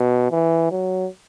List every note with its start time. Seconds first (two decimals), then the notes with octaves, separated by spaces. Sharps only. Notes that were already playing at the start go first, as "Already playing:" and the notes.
Already playing: B2
0.31 E3
0.71 F#3